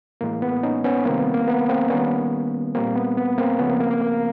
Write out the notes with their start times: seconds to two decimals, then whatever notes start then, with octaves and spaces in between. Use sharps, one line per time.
0.21 A2 E3 G#3 A#3
0.42 B3
0.63 C#4 D#4
0.84 B3 C#4
1.05 C3 D#3 G3 A#3 C4
1.19 B3
1.34 A#3
1.48 B3
1.69 A#3 C4
1.90 D#3 G3 A#3 B3 C#4
2.75 A#2 G3 A#3 C4
2.95 B3
3.17 B3
3.38 A#3 C4
3.59 C#3 F3 A3 B3 C#4
3.70 A#3 C4
3.80 A#3
3.91 A#3
4.01 A#3